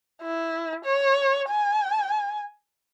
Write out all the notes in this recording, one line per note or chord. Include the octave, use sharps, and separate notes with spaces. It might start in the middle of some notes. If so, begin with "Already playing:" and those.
E4
C#5
G#5